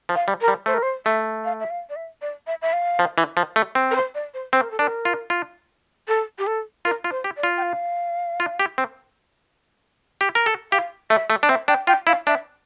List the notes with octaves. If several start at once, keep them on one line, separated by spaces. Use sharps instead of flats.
F3
F5
G3
A#4
G3
A3 C5
A#4
C5
A3 E5
F5
E5
F5
D5
E5
D5
E5
E5
F5
F3
E3
F3
A3
C4
A#4
C5
D5
C5
C4 C5
A#4
A4
D4 A#4
F4
F4
A4
G4
A4
F4 A#4
F4
C5
G4
D5
F4
G5
F5
F4
G4
C4
G4
A#4
A4
G4 F5
A3 E5
A3
D4
C4 E5
D4 G5
F4 G5
E4 F5
D4 E5